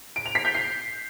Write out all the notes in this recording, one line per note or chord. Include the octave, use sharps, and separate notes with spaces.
D7
F7
B6
G6
C7